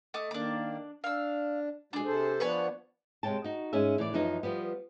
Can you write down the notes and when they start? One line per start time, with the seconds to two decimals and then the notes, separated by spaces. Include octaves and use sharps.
0.14 A3 D#5 D6
0.31 D#3 A#3 D4 D6
1.04 D4 F5 E6
1.93 B2 F#3 G#3 D4 G#4
2.05 C3 A4 C5
2.40 F3 B3 D4 B4 C#5 G#5
3.23 C3 G#3 C#5 G5 A5
3.44 D#4 F#4
3.73 G#2 C#4 G#4 E5
3.98 A2 E3 D5
4.13 F#2 E3 F3 D#4
4.43 F3 G3 B3